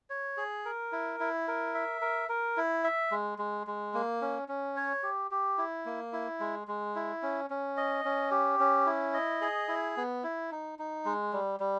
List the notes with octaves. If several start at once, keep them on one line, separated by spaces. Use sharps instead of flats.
C#5
G#4
A#4
E4
E4
A#4
E5
A#4
A#4
E4
E5
G#3
G#3
G#3
A#3
C#4
C#4
C#5
G4
G4
E4
A#3
E4
G#3
G#3
E4
C#4
C#4
D#5
C#4
G4
C#4
E4
D#5
G#4
E4
B3
E4
D#4
D#4
G#3
G3
G3